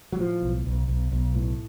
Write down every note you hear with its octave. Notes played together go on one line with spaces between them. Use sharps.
F#3
A2 F3
B1
B1
B1
B1
A2